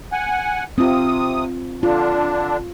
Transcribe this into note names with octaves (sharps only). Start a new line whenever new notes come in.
F#5 G#5
C3 C4 F4 D#6
D3 D4 F4